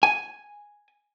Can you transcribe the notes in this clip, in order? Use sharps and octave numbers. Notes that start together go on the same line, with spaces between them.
G#5